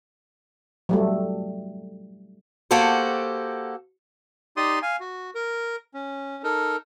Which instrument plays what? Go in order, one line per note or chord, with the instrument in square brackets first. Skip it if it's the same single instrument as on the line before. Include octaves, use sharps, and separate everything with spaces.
[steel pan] F#3 G3 A3
[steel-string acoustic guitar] A#3 F#4 G4 A4 C5
[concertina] D#4 G4 D5 C6 D#6
F5 G#5
F#4
A#4
C#4
D#4 A4 A#4